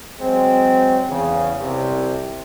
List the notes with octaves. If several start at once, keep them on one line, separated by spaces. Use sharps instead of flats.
F#3 G#3 C4
E2 C#3
C2 C3